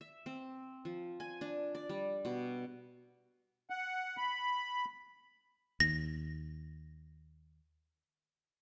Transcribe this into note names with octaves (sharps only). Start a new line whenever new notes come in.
E5
C4
F3
G#5
D4
D5
G3
B2
F#5
B5
D#2 A#6